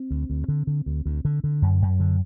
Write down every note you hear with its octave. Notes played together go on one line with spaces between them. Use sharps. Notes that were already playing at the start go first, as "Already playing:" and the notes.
Already playing: C4
D2
D2
D3
D3
D2
D2
D3
D3
F#2
F#2
D3